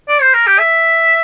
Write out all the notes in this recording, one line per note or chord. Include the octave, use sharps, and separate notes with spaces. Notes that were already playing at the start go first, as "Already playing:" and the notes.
D5
C5
A#4
G4
E5